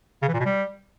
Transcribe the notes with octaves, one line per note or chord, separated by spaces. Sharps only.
C#3
E3
A#2
B2
G3